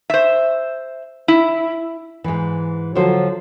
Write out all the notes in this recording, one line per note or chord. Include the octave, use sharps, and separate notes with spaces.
C5 E5
E4
G#2 E3
D3 F3 F#3 C5